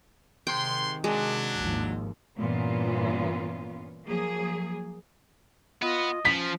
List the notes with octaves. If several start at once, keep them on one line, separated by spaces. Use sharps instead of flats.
G#2 C3 D#3 G5 C6
F#3 G#3 D4
G#1 D#2 F3
G2 A#2 E3 B3 C#4 F4
F3 F#3 A#3 G#4
B3 F4 B4 D#5
F3 C#4 B6